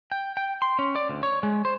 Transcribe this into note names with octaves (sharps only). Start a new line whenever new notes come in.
G5
G5
C6
C#4
D5
D2
C#5
G#3
C5